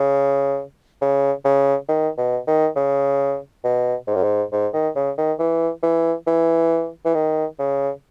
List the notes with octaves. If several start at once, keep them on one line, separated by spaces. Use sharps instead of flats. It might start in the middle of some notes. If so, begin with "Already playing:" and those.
Already playing: C#3
C#3
C#3
D#3
B2
D#3
C#3
B2
G#2
F#2
G#2
G#2
D#3
C#3
D#3
E3
E3
E3
E3
D#3
C#3